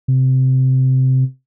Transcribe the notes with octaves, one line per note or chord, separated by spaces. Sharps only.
C3